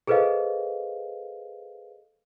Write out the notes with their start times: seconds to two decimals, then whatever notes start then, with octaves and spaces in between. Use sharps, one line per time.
0.07 G#4 A4 B4 C5 D#5 F5